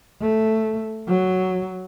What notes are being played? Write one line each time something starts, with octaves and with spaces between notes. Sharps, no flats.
A3
F#3